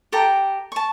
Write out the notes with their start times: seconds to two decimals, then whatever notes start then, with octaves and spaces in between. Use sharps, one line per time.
0.12 G4 A4 G5 A#5
0.72 A5 C#6